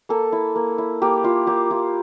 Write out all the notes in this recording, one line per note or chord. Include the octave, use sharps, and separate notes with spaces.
A#3 A4
E4
A#3
E4
A#3 G4
E4 F4
A#3 G4
E4 F4